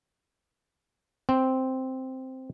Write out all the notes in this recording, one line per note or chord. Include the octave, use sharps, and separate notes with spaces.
C4